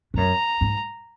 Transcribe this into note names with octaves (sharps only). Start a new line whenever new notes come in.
G#2
F#2 A#5
G#2